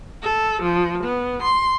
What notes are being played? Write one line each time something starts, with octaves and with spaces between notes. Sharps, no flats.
A4
F3
B3
C6